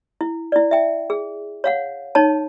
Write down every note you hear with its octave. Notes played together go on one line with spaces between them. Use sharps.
E4
E4 D5
E5 G5
G#4
C#5 F5 F#5
D#4 C#5 A5